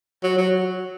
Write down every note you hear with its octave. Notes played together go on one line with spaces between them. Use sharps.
F#3
F#3